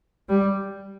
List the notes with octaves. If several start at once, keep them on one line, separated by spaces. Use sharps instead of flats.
G3